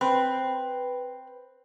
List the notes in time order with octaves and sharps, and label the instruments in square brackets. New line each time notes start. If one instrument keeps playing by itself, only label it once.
[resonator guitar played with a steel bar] C4 [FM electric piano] B4